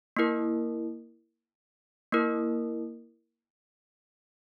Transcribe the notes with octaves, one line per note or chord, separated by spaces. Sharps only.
A#3 E4 A#4
A#3 E4 A#4